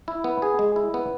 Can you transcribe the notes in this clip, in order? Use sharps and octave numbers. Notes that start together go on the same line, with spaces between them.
E4
B3
G#4
G#3
E4
B3